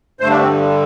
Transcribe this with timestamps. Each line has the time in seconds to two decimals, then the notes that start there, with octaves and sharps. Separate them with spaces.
0.20 G2 D3 A3 C5
0.29 D4
0.39 C4